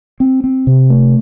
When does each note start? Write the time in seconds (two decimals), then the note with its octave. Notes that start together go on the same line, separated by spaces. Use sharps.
0.20 C4
0.44 C4
0.67 C3
0.90 A3